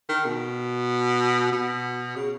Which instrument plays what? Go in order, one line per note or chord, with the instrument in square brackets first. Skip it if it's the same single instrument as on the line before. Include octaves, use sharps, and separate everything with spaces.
[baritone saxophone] D#3
B2
B2
C#3